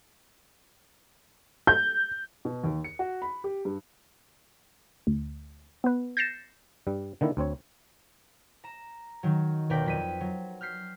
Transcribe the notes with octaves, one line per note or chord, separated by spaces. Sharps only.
G6
B2
D#2
C#7
F#4
B5
G4
G2
D2
B3 B4
G6 A6 A#6 C7 C#7 E7
G2 G3
D3 D#3 A#3 E4
D2 C4 C#5
A#5 E7
D#3 F#3
D#2 B2 A#4 D5 G5 B6
F2 B6 D#7
F#3
F6 G6 B6 C7